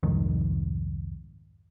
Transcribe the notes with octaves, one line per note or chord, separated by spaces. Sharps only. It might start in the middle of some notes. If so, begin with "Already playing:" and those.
C2 F2 G#2 D#3